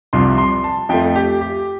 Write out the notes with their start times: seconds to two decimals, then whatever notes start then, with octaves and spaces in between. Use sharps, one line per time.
0.13 C2 C3 F3 C6
0.38 C6
0.64 A5
0.89 F2 F3 A3 G5
1.16 G4
1.41 G4